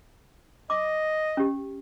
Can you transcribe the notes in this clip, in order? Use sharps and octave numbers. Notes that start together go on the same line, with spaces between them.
D#5 D6
C#4 G4